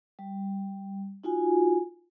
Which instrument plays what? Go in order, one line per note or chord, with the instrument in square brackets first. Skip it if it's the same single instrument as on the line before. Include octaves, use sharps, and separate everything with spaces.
[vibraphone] G3
D#4 F4 F#4 G#5